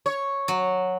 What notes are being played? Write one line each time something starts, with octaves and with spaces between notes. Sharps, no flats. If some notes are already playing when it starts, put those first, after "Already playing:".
C#5
F#3